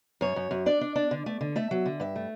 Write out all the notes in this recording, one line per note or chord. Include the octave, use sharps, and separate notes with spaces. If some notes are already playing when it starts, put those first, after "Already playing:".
F#2 C#5
F#2
F#2
D4 D5
D4
D4
D3
A3
D3
A3 E5
F#3
D3
G2 E5
A3